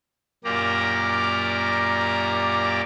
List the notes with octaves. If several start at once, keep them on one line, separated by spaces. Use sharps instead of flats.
F#2 A#2 A#3 G4 D5 A#5